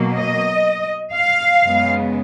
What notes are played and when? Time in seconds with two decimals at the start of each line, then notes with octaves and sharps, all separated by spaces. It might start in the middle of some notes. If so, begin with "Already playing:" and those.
Already playing: B2 F#3 A#3
0.15 D#5
1.15 F5
1.64 F#2 C#3 G#3 B3